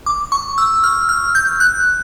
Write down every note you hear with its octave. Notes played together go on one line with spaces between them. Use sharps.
D6
C#6
E6
F6
F6
G6
F#6